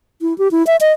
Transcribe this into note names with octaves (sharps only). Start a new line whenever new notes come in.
E4
G4
E4
E5
D#5